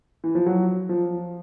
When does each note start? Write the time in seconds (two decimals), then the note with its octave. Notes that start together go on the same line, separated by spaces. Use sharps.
0.24 E3
0.35 F3
0.46 F#3
0.89 F3